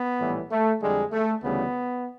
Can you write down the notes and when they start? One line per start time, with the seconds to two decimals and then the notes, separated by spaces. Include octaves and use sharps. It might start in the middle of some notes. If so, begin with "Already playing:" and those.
Already playing: B3
0.20 A#1 A2 E3 G3
0.51 A3
0.81 F2 D3 G3 G#3
1.12 A3
1.43 D2 C#3 E3 G3 B3